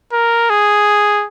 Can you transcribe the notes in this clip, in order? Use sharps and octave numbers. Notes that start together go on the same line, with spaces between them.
A#4
G#4